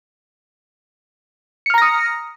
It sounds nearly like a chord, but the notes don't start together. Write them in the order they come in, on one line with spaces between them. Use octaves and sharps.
C#7 F6 A#5 A#6 D#6